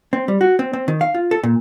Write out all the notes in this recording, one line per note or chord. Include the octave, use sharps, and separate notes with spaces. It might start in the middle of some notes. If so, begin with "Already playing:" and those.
C4
G3
F#4
C4
C4
D#3
F5
F4
A4
A#2